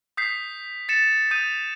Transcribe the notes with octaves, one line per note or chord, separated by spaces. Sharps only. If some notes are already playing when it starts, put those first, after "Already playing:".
D#6 G6 B6 C7
A6 C#7 E7
D#6 G6 D#7